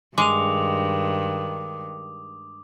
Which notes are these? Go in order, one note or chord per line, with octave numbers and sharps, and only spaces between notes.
G2 D#3 G#3 D6 D#6 F7